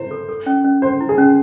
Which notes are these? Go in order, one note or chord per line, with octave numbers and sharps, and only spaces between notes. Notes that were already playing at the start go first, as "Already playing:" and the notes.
Already playing: E4 C5
A4
A4
C#4
C#4
C#4 C5
E4
G#4
C#4